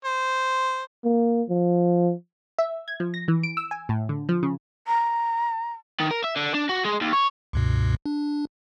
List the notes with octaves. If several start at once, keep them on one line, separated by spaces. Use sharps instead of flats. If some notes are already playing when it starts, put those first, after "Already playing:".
C5
A#3
F3
E5
G#6
F3
A#6
E3
D7
E6
G#5
A2
D3
F3
C#3
A#5
D#3
A#4
E5
D3
D4
F#4
G#3
D#2
C#5
C#2 G2 B2
D4